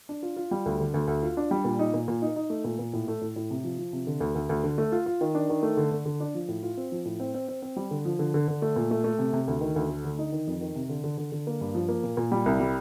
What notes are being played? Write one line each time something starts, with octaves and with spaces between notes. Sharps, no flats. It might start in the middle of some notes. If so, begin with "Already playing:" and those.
D4
F4
F4
G3
D2
D3
D2
D2
F4
D4
G3
A#2
D#4
A#2
A#2
D#4
D#4
A3
A#2
A#2
A2
A3
A2
A2
C3
F3
F3
C3
D3
D2
D2
D2
D3
A3
F4
F4
D#3
D4
D#3
A3
D3
D3
D3
D4
F3
A2
F4
C4
F3
A2
C4
C4
C4
C4
G3
D3
F3
D3
D3
D3
A3
A#2
A3
A3
C3
C3
D2
D#3
D2
A3
D3
D#4
D#3
F2
D#3
C3
D3
D3
D3
D3
A#3
G2
F3
A#3
A#2
A#2
G3
C2
G3